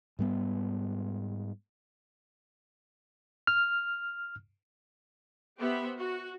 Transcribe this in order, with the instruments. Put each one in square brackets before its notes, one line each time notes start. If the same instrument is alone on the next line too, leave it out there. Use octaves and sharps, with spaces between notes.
[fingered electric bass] G#2 G3 B3
[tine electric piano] F6
[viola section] B3 G4 C5 E5 B5
F#4